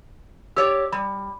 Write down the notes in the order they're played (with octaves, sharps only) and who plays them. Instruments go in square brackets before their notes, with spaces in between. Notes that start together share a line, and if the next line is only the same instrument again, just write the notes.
[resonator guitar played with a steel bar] G4 C#5 D5 [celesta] E6
[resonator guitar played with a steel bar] G3 [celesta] B5